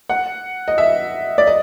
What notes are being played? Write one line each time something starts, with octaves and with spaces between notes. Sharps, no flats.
F#5
D#5
E5
D5
D#5